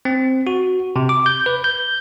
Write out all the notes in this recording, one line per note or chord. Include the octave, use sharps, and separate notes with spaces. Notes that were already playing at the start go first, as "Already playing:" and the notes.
C4
F#4
C3
D6
G6
B4
G6